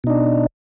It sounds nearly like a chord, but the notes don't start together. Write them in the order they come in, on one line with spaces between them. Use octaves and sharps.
B2 D#4 D4